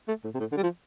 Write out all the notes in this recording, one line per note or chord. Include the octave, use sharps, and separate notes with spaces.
A3
A2
C3
A2
D3
G3
F3